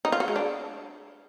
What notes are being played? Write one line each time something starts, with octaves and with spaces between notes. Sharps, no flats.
D#4
F4
F#4
G#3
D4